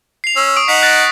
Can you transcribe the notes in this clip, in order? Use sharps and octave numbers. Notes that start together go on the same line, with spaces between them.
C7 F7
C#4 E6
C#6 D#6 D7
D#4 F#5 B6 C7
F#6 A6 A#6